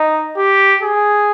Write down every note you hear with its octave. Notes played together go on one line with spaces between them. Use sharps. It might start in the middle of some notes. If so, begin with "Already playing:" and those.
Already playing: D#4
G4
G#4